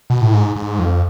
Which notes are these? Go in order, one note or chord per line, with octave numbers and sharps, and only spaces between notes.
B2
A2
G#2
G#2
F2